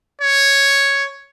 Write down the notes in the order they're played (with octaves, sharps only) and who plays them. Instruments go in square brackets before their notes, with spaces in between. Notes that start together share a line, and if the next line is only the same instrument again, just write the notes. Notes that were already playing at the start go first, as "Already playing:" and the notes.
[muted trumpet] C#5